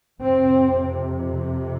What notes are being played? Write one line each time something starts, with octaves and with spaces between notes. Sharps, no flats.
F2 C3 C4